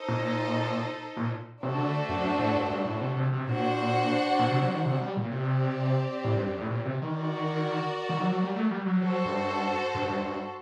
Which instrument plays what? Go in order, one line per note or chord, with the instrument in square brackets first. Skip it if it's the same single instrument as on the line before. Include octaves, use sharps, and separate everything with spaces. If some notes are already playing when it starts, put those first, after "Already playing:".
Already playing: [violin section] D#4 A4 C5 D#5
[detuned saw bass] A#2
A#2
[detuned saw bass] C3 [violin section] A3 D4 F#4 A4 C5
[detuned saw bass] D3
F#2
F#2
A2
G2
G2
A2
C3
C3
C3
[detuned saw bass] A#2 [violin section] D4 F#4 C5 F#5
[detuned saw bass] A#2
C3
F#3
D#3
C3
G3
A#2
[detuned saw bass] C3 [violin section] C4 G4 D5
[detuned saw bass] A2
G2
F#2
A2
A#2
C3
D#3
[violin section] F#4 A#4 D5
[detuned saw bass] D#3
F#3
F#3
G3
A3
G3
F#3
[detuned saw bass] F#3 [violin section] F#4 A4 C5
[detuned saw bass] G2
G2
G2
G2